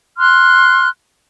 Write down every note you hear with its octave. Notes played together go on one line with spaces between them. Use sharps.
C6 F6 F#6